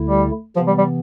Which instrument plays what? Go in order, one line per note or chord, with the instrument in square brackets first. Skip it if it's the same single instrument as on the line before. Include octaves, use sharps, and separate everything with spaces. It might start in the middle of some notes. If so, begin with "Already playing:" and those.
Already playing: [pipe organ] D2 D3 A3 E4
[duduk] G3
[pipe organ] C3 E3 B3 [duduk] F3
[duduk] G3
G3